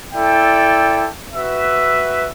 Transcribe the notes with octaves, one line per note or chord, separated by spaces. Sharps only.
E4 A4 D5 G5
F#4 B4 E5